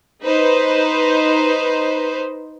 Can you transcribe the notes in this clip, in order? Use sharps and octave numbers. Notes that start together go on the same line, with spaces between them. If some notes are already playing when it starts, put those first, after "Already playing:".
D#4 B4 C5